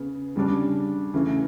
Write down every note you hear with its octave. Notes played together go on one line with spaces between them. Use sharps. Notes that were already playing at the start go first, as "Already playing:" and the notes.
Already playing: C#3 B3
C#3 G3 D4
C#3 E3 A3